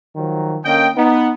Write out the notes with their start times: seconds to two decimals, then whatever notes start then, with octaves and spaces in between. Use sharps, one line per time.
0.15 D#3 F3 F#3
0.64 D3 A#3 C#4 D#5 G5
0.96 B3 D#4